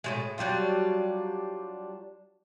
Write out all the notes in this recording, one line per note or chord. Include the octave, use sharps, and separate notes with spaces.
A2 F3 G#3
F#3 G3 D4 F4